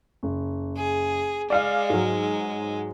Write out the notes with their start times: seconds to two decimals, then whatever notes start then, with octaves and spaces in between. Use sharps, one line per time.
0.23 F#1
0.76 G#4
1.50 G#3 D5 F5 F6
1.90 G#2 F#3